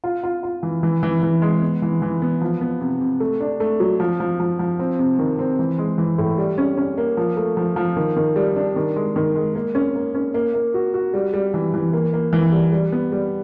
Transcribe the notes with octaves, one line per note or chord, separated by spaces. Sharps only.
F4
F4
F4
E3
E3
E3
E3
G#3
B3
E3
E3
B3
F3
B3
C3
C3
A3
D4
A3
F#3
F3
F3
F3
F3
C4
C3
D#3
C4
E3
G#3
E3
A2
G3
C#4
C#4
A#3
F3
A3
F3
F3
D#3
D#3
G3
D4
D#3
G#3
D#3
G#3
A#3
C#4
A#3
C#4
A#3
A#3
F#4
F#4
G3
G3
E3
E3
A#3
A#3
E3
G3
G3
B3
G3